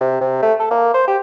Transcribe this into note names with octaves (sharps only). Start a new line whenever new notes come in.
C3
C3
A3
A4
A#3
C5
G4